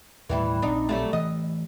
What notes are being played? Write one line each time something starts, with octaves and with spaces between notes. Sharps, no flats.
D#2 A2 E3 G3 E4
A#1 C4 D4 D#4
F#3 G3 A3
E3 A3 D#5